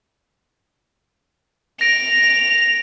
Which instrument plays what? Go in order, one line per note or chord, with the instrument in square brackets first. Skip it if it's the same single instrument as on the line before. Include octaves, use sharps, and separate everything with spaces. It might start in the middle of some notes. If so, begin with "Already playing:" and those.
[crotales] A#6 D7 [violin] F7